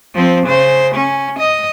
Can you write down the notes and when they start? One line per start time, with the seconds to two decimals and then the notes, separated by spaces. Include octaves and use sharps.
0.14 F3 C4
0.47 C#3 C5
0.95 C#4
1.39 D#5